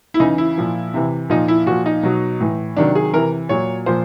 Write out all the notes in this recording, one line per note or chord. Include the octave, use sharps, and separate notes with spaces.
E4
C#3 E3 D#4
E4
A#2 F3
C3 E3
A#2 F3 D#4
E4
A#2 F3 F#4
D#4
B2 F#3
A2 E3
C3 D#3 F#3 D4
G#4
C3 E3 A#4
A#2 F#3 C#5
A#2 F3 C5